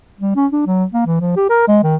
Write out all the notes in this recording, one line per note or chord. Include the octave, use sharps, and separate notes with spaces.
G3
C#4
D4
F#3
A#3
E3
F3
G4
A#4
G#3
D#3